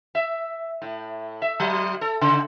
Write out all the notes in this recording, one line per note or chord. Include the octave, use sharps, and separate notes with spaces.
E5
A2
E5
F#3
A4
C#3